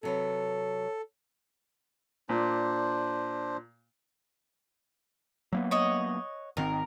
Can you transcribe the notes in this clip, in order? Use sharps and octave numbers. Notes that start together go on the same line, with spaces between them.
C3 F#3 A4 B4
A#2 D4 C5
F#3 A#3 B3
C#5 D#5 F#5
G#1 D#3 C4 A#4